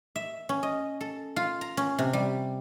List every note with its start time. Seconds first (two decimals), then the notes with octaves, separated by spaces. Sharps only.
0.16 E5
0.49 C#4
0.63 D#5
1.01 A4
1.36 F4
1.61 A#5
1.77 C#4
1.98 C3
2.13 G3